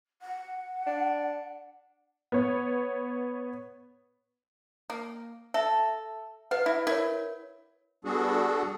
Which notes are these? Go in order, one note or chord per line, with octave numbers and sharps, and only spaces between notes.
F#5
D4
B3 C#5
A#3
A4 E5
B4 D#5 F5 F#5
E4 E5
E4 A#4 C#5
G3 B3 D4 F#4 G#4 A4